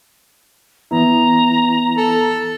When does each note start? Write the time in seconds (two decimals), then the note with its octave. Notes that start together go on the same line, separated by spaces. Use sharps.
0.91 E3 B3 E4 A#5
1.97 A4